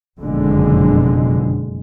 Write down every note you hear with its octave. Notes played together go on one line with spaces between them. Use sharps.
F#1 F2 B2 D3 G#3